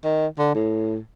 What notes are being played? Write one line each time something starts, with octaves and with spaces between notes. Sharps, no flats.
D#3
D3
A2